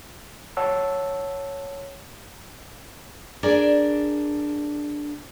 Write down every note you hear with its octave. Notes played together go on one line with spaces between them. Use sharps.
C#5 F#5 A5 E6
D4 G#4 A#4 D5